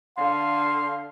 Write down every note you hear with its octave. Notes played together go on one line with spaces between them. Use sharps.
D3 F5 C6